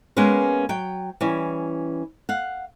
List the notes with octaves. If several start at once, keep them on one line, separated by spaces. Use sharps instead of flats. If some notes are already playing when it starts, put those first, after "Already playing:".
G#3 A#3 B3 C#4 B4
F#3 G5
E3 G3 C#4
F5 F#5